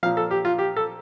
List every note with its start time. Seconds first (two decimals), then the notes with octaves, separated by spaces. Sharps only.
0.03 A#2 F3 F5
0.17 A4
0.31 G4
0.45 F4
0.58 G4
0.76 A4